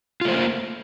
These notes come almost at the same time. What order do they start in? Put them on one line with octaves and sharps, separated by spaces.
F4 A3 C5 A#3